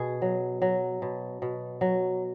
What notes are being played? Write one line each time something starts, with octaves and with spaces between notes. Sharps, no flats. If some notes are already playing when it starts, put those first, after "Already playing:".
Already playing: B2 G#4
F#3
F#3
B2
B2
F#3